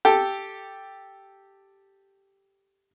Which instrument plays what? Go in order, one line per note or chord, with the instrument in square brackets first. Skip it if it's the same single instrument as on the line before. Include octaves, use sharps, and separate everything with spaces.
[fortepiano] G4 A4